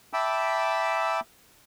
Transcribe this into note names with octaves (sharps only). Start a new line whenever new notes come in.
E5 G5 A5 B5 D6 E6